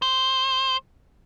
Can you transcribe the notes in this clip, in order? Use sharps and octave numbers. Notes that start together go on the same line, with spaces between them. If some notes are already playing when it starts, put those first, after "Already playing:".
C5